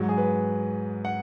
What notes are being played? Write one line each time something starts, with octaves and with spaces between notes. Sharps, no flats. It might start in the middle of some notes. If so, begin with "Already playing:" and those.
Already playing: G#2 F#3
G#4
B4
F#5